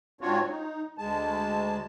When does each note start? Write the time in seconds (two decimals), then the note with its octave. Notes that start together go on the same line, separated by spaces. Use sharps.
0.21 G#2 C4 D4 F4 F#4 C#5
0.49 D#4
0.98 D2 G#3 A5